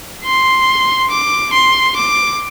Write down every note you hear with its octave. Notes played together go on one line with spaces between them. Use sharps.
C6
D6
C6
D6